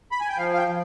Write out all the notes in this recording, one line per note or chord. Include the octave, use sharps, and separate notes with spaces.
B5
G#5
G5
F3 F5
F5
G5
F3